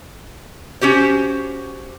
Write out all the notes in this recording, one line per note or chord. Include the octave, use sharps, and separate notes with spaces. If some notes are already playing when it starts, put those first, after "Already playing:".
C#4 F#4 G4 C5